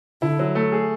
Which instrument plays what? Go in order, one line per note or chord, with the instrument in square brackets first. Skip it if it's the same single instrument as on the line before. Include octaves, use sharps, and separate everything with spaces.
[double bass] D3 [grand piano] E4
[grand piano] F#3
A3
G#4